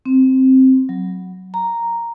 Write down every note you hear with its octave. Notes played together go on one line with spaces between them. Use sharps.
C4
F#3
A#5